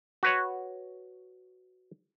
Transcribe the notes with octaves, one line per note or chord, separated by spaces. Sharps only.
F#4 B4 C#5